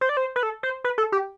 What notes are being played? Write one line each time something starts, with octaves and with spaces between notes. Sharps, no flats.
C5
D5
C5
B4
A4
C5
B4
A4
G4